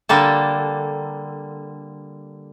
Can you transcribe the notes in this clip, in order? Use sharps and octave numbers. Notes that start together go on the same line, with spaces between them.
D3 G3 A#3 A4